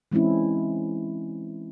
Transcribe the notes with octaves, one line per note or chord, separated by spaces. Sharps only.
E3 G#3 C4 C#4 E4